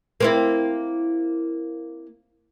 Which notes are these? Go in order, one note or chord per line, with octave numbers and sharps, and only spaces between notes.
A#3 C4 E4